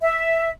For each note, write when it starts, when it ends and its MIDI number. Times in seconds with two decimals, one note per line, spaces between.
0.01 0.50 76